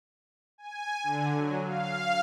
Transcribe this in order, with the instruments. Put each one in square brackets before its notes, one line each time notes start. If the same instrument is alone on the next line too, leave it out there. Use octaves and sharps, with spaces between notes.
[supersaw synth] G#5
D3
F#3
F5